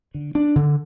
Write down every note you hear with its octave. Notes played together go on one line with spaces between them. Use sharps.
D3
D4
D3